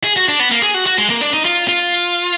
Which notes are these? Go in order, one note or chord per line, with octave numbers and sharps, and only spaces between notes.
G#4
F#4
D4
B3
A#3
G#4
F#4
F#4
G#3
A#3
D4
D#4
F4
F4